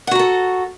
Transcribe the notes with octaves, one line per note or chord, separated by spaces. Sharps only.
F#4 A4 F#5 A#5